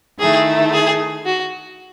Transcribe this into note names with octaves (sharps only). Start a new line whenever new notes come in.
D#3 A3 E4 G#4
G#4
F#4